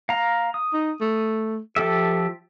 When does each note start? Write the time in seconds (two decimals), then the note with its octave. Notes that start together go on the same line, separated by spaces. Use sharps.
0.09 F5 A#5
0.54 D#6
0.73 D#4
1.01 A3
1.76 F3 G4 A4 E5